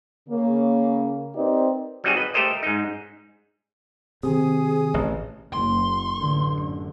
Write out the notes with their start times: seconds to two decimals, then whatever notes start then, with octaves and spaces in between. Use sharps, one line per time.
0.29 C#3 A#3
1.35 C4 D#4 G4 A#4 B4 D5
2.04 F#3 G3 C4 D#4 F#4 G#4
2.17 B4 D#5
2.34 A3 G4 A4 A#4 C5 D#5
2.63 G#2 D#4
4.23 C3 D#3 G#4 G#5 D#6
4.94 A1
5.53 F#1 C6
6.17 A1 F#2 D3